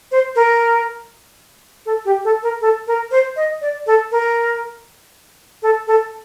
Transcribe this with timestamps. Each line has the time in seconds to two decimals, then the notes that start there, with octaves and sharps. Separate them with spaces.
0.12 C5
0.36 A#4
1.86 A4
2.05 G4
2.25 A4
2.43 A#4
2.61 A4
2.87 A#4
3.11 C5
3.36 D#5
3.61 D5
3.87 A4
4.12 A#4
5.63 A4
5.87 A4